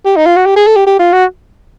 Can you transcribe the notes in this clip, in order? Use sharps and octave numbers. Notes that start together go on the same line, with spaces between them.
G4
D#4
F4
F#4
G4
G#4
A4
G4
G4
F4
F#4